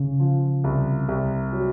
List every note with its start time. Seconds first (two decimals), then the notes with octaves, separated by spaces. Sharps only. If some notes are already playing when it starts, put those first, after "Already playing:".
Already playing: C#3
0.20 F3
0.64 C2
1.08 C2
1.53 F#3